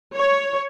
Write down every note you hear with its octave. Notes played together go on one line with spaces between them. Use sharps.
C#5